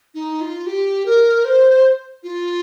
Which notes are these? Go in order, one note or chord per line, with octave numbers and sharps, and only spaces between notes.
D#4
F4
G4
A#4
C5
F4